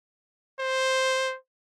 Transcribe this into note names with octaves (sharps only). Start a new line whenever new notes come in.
C5